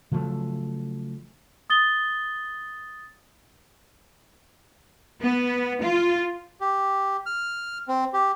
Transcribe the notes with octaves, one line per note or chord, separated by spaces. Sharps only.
C#3 F3 F#3 A3
D#6 A6 G7
B3
F4
G4
F6
C4
G4